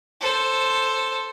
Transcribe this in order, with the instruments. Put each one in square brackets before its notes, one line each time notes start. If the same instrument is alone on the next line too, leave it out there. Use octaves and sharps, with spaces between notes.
[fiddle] A4 C5